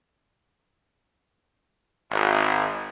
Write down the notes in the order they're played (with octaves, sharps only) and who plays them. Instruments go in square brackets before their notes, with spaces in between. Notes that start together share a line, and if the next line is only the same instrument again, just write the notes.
[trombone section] G#1